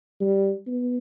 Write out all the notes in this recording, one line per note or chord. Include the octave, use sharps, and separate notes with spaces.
G3
B3